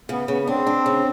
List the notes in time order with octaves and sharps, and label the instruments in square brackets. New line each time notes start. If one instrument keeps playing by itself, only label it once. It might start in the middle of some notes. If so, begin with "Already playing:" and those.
[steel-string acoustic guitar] C#3 [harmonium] B3
[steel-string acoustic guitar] C#3 [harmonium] B3
[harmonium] B3
[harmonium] C4 [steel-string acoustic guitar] D4
[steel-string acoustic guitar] D4
C#3